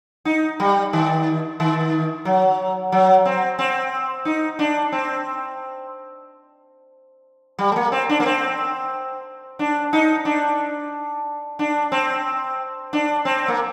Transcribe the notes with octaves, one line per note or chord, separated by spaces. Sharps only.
D#4
G3
D#3
D#3
F#3
F#3
C4
C4
D#4
D4
C4
G3
A3
A#3
C4
D4
A#3
C4
D4
D#4
D4
D4
C4
D4
C4
A#3